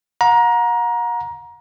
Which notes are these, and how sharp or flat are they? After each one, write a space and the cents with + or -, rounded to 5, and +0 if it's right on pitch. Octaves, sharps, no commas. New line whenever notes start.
F#5 -40 A#5 +20